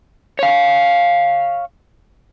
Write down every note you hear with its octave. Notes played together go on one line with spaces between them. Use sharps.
C#5 F5